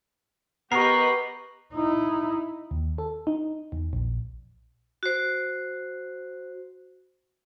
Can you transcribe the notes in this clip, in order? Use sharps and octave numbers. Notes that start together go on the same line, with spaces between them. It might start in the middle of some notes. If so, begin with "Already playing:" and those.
B3 G4 A#4 B4 D#5 C#6 C7
D#4 E4
D#2
A4
D#4
E2
A#1
F#4 C5